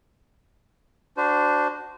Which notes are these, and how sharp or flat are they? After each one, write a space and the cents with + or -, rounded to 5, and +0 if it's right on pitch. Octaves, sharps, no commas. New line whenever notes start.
D4 +0 F#4 +0 C5 -25